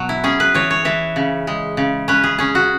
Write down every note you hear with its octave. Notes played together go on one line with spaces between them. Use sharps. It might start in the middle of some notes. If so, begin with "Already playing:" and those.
Already playing: B2 F#3
E4
C#4 G#4
B4
E3 C#5
C#5
E3 E5
C#3
G#3
C#3
C#4 B4
G#4
C#4 G#4
F#4